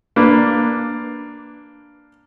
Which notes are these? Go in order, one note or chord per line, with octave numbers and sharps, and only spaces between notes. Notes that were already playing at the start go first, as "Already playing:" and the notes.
A#3 D4 B4